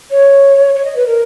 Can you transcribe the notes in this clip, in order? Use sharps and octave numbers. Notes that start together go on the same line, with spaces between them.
C#5
C#5
D#5
B4
A#4